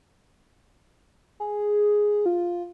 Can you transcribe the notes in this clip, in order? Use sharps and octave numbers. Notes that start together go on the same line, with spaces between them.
G#4
F4